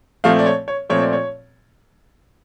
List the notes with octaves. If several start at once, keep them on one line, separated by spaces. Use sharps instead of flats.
A#2 F3 A3 C4 F5
D5
C#5
C#5
A#2 F3 A3 C4 C#5
D5
C#5